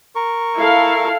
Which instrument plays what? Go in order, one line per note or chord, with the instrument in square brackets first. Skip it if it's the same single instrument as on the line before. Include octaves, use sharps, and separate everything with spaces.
[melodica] A#4 C#6
[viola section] E4 A4 F5